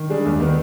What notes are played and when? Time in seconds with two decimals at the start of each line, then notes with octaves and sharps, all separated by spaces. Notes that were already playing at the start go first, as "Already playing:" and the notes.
Already playing: D#3
0.10 G3 D4 G#4
0.25 D#2
0.40 D#3 B3